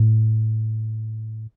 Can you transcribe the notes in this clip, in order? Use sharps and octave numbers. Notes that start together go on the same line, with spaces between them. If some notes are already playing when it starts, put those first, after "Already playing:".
Already playing: A2